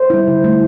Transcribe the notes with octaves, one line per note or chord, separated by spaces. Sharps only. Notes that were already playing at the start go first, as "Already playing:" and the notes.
Already playing: C5
G3 E4
D3
A3 E4